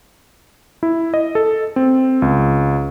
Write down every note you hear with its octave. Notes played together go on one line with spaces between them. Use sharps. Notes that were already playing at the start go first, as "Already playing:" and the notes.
E4
D#5
A4
C4
C#2